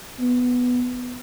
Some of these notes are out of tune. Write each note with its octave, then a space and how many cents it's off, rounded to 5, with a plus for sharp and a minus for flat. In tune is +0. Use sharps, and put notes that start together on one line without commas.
B3 +0